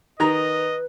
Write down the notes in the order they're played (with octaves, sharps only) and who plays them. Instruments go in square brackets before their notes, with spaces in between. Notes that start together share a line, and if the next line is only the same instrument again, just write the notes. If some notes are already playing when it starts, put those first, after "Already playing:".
[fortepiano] D#3 A#5 [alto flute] B4 [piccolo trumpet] D#5